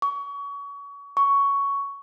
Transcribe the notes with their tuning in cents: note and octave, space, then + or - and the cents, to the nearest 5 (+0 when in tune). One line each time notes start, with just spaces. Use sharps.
C#6 +30
C#6 +10